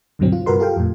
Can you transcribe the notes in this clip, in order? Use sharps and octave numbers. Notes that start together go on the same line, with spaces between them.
C#2 G2 B2 D3 F#3 C4
F4
G2 C3 F#4 A#4 B4 C6
F4 G4 A4 F5 G5
F2 A2